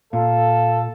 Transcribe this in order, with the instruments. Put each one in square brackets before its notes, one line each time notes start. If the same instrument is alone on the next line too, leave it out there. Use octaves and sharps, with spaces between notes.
[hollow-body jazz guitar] A#2 [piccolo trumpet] A4 [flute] F5